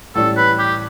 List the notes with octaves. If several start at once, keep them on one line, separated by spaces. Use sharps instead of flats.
A2 E3 G3 C#4 A4
B4
G4